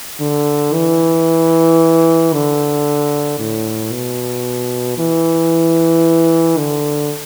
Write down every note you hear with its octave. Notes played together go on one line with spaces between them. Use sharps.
D3
E3
D3
A2
B2
E3
D3